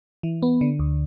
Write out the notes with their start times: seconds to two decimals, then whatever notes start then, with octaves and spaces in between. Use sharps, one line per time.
0.23 E3
0.42 B3
0.61 D3
0.79 D2